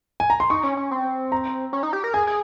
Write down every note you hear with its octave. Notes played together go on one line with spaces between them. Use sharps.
G#5
A#5
C6
D#4 C#6
C#4
C#4
C4
A#5
C#4
D#4
G4
A#4
G#4 G#5
G#4